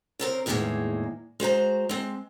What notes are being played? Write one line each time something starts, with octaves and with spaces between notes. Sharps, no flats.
C#3 C4 A#4
E2 A2 D#3 F3 G#3 A#3
G#3 F#4 C5 A#5
G#3 C4